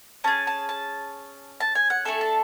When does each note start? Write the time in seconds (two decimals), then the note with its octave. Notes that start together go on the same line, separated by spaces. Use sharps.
0.24 C#4 G#4 A5
0.47 A5
0.69 A5
1.60 A5
1.75 G#5
1.90 F#5
2.05 A3 D4 A4 G#5
2.21 A5